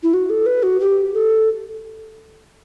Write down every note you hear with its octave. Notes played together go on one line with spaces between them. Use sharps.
E4
F#4
A4
B4
F#4
G4
A4